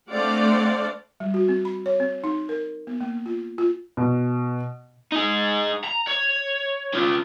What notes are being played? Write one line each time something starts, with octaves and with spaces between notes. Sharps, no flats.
A3 C4 D4 D5 F5 F#5
G3
F#4
C4
B5
C#5
C4
D#4
A#4
B3
A#3
F4
F4
B2
D#4 G#4
A#5
C#5
C#4 F4